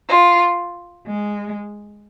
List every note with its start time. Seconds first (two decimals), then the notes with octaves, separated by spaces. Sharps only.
0.09 F4
1.06 G#3